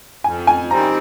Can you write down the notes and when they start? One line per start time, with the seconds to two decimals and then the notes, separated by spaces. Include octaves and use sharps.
0.24 F2 G#5
0.47 G#5
0.70 D#3 G3 C4 A#5